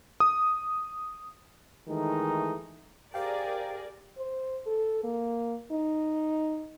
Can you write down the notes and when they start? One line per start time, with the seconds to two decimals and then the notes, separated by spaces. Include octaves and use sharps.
0.20 D#6
1.88 D#3 E3 G#3 A3 D#4
3.14 G4 G#4 A#4 C5 D5 F5 G5
4.18 C5
4.66 A4
5.04 A#3
5.71 D#4